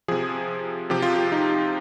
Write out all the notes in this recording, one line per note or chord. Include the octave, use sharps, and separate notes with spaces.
C3 F3 G#4
C3 F3 G4
F4
G4
D#4